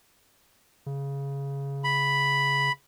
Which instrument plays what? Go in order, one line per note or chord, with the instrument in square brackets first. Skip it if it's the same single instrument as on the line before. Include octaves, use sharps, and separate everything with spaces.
[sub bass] C#3
[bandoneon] B5